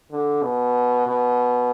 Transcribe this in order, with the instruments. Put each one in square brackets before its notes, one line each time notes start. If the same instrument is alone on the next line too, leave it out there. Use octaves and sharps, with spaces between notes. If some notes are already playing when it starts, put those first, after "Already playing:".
[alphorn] D3
B2
B2